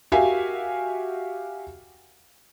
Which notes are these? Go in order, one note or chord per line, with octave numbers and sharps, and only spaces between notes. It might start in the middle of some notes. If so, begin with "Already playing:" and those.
F#4 G4 A#4 E5 F5 G#5